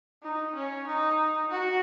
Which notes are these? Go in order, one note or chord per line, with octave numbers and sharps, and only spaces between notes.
D#4
C#4
D#4
F#4